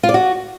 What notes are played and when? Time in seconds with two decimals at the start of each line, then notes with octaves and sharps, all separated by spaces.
0.03 F4
0.09 D5
0.14 F#4